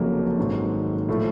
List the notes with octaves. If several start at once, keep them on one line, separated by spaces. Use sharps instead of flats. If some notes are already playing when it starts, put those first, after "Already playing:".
Already playing: F1 F2 C#3 F#3 A#3
G#1 G#2 D#3 F#3
A2 F3 A3